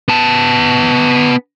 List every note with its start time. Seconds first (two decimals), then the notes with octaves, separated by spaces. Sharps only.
0.08 B3 A5